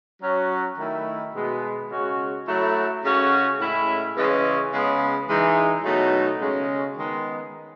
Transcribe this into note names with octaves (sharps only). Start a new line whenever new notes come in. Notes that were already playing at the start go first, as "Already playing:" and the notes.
F#3 C#4 F#4
D#3 A3 E4
B2 G#3 B3
C#3 G#3 C#4 F#4
F#3 A3 E4
C#3 G#3 C#4 F#4
A2 G#3 C#4 E4
C#3 E3 G#3 C#4
C#3 G#3 B3
E3 G#3 D#4
B2 F#3 A3 D#4
C#3 G#3 C#4
D#3 G#3 B3